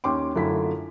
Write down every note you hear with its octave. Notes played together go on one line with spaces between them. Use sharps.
D#2 C#4 G5 C6 D6
F#2 D3 A3 E4 F4 B6